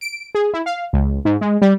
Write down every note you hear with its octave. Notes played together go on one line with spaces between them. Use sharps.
D7
G#4
E4
F5
C#2
G#2
G#3
G3